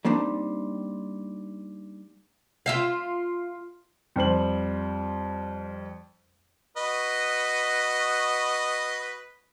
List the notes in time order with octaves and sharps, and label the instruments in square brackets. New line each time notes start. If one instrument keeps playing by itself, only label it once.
[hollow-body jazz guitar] G3 A#3 C4 D4 D#4
[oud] F4 E5 F5
[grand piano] F2 G3 C5 F#7
[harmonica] F#4 B4 D#5